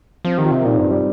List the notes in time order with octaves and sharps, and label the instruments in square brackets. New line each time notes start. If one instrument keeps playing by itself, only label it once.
[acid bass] F3 [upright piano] C4
[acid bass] D#3 [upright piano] G4
[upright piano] C4 F4
[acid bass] C3
[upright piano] A#4
[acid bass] A#2 [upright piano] D#4 G4
[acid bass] G2
G3